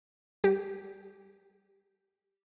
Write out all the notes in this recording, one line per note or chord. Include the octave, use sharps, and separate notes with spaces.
G3 G4